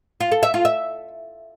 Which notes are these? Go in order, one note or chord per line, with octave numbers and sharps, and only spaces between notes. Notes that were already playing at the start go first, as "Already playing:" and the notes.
F4
A4
E5
F4
E5